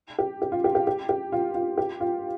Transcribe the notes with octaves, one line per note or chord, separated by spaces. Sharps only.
G4
G4
F4
G4
G4
G4
G4
F4
F4
G4
F4